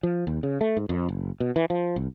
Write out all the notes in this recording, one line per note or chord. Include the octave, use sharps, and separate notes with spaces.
F3
D#2
C#3
A3
G#2
F2
F#1
B2
E3
F3
C2